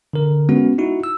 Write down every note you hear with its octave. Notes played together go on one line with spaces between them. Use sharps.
D3 A#4
G#3 B3 C#4 F#4
D#4 E4 F#4
E6